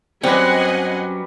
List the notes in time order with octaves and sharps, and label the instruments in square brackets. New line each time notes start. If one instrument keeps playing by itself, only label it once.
[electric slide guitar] F#3 C#4 [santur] G3 B4 [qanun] C4 [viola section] D#5 F#5 G#5